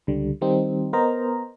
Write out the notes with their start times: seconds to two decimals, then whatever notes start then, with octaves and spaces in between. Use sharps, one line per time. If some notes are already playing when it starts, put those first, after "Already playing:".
0.07 C#2 D3 G3
0.41 D#3 G3 C4 D#4
0.93 B3 A#4 C5 D#5 A#5